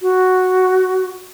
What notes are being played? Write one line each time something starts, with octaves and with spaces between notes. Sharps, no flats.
F#4